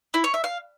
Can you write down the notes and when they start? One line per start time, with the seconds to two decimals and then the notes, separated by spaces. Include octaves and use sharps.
0.14 E4
0.24 C#5
0.34 E5
0.44 F5